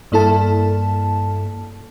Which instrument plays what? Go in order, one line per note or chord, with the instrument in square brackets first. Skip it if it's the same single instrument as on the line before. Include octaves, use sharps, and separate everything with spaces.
[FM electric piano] G2 A#3 E4 A4 A5